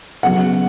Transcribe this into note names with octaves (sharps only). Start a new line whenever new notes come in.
C#3 F#3 B3 F#5